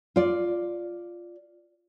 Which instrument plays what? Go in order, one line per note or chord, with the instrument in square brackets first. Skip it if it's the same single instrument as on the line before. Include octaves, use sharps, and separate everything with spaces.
[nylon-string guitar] F4 D5